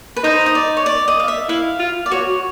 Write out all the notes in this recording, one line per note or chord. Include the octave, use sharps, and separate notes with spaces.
B4
D#4 C5
D#5
D5
C#5
D5
D#5
F5
E5
E4 F5
F4
D5
F#4 C#5